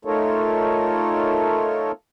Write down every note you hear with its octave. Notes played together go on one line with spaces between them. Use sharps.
A3 D#4 F4 A4 A#4 C#5